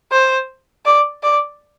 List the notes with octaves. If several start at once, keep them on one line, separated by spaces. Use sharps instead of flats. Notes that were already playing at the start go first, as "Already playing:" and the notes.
C5
D5
D5